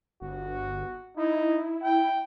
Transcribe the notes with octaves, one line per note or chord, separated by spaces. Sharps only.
G1 F#4
D#4 E4
G5